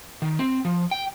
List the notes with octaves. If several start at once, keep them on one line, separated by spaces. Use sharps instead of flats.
D#3
C4
F3
G5